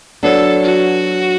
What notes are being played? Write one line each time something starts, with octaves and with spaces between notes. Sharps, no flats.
F#3 B3 D4 A4
F#4